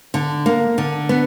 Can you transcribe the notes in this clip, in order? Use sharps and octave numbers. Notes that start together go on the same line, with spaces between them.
D3
A#3
D3
B3